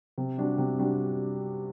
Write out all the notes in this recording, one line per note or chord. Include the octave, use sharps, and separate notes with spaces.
C3
G3 D4 F#4
C3
G3 D4 F#4